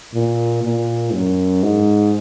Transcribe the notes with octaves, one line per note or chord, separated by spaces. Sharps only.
A#2
A#2
F#2
G#2